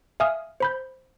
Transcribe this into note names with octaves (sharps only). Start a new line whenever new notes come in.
E5 F5 G#5 D#6 F6
C5 B5 G6